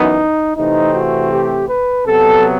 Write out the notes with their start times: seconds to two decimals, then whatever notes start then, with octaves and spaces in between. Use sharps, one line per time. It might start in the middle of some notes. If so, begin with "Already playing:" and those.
Already playing: F#2 E3 B3 D#4
0.56 C3 E3 A3 C4 D#4
0.94 F#4
1.31 G4
1.68 B4
2.06 C3 F#3 B3 A4